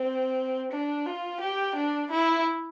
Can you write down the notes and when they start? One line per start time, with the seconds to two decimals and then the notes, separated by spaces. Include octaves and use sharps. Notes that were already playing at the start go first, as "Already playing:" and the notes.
Already playing: C4
0.72 D4
1.06 F4
1.41 G4
1.75 D4
2.11 E4